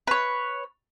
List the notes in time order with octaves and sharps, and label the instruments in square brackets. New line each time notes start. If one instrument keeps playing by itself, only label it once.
[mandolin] B4 C#5